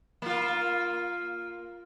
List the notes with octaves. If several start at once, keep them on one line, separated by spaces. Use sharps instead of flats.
A#3 F4